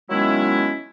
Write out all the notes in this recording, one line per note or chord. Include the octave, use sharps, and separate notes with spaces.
D#3 F#3 G#3 B3 C#4 E4